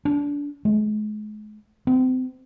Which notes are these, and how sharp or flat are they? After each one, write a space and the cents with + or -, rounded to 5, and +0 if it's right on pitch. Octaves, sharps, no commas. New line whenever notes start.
D4 -25
G#3 +40
C4 -35